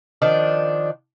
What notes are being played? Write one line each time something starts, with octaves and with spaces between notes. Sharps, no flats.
D#3 F3 D4